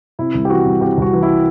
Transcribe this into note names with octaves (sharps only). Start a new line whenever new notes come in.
C3 E4
C2
G4
E3 F#4
C2
C3 G4
C2 F#4
E3
E4